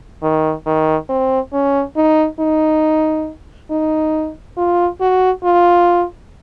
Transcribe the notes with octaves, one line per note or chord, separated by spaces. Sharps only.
D#3
D#3
C4
C#4
D#4
D#4
D#4
F4
F#4
F4